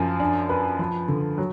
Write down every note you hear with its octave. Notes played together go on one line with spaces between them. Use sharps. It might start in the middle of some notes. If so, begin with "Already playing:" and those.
Already playing: F#2 F3
D4
B4
F3
D3
F#3